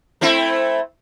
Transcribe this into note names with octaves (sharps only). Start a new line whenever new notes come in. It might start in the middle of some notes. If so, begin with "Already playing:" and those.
A3 C4 E4